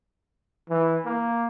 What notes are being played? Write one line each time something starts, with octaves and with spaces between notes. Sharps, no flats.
E3
A#3